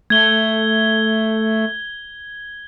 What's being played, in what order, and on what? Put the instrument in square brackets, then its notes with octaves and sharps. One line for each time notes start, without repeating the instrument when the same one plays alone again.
[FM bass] A3 [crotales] G#6 G7